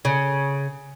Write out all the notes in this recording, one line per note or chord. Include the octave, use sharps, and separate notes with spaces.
C#3